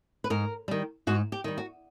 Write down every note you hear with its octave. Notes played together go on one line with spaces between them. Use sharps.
B4
G#2 A#4
D#3 G3
G#2 F#4
G4
D#3 G3
F#4